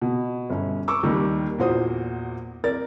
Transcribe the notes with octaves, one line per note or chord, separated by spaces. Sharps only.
B2
G1 C#4
C#6 D6 E6
D#2 D#3 G3
E2 A#2 F#4 C5 D#6
A#4 D5 A6